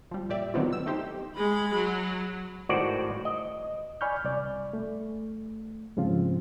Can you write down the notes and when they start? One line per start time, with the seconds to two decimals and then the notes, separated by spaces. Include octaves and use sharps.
0.11 F3 G3
0.29 A#2 G4 D5 E5
0.54 D#3 F#3 A3 B3 C4 F4
0.73 E6
0.86 A3 D#4 G4 C5
1.35 G#3 B5
1.74 F#3
2.69 G#1 A2 D#3 F#4 C5 D5
3.25 D#5
4.01 D5 G#5 B5 C#6 F6 G6
4.24 C2 D5
4.73 A3
5.97 G#2 C#3 F3 C4 F4